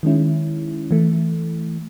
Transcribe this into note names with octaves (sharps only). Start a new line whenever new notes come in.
D#3 G#3 C#4 E4
E3 A3